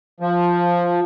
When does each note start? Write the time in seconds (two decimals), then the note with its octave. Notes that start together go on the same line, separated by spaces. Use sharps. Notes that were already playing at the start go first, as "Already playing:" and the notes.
0.20 F3